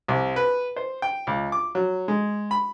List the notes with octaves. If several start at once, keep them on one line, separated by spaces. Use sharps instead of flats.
C2
B4
C5
G5
C#2
D6
F#3
G#3
B5